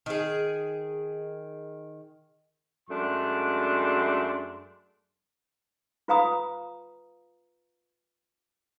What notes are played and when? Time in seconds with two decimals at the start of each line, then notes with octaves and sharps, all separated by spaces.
0.06 D#3 G#4
2.89 F#2 G#3 A3 D4 F#4 C6
6.08 F4 B4 F5 A#5 B5 D#6